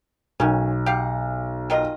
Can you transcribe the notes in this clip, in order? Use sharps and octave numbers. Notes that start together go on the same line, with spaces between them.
B1 D#3 C#4
G4 F5 F#5
D#3 F4 D#5